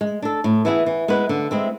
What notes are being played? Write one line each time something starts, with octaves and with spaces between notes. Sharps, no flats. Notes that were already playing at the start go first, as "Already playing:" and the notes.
G#3
D4 A4
A2
E3 B3 E4 G#4
E3
G#3 B3 E4 B4
D3
G#3 C4 E4